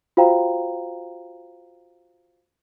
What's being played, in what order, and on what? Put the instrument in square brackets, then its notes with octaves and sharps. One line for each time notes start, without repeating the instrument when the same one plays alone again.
[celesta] F4 F#4 C5 F5 G5 A#5